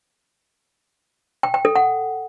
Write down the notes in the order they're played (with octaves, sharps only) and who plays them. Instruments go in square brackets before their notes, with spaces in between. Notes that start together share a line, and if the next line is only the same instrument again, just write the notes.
[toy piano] G5
G5
A4
F#5